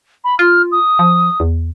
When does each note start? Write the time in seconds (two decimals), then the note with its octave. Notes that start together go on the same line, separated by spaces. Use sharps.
0.24 B5
0.39 F4 F6
0.72 D#6
0.99 F3
1.40 E2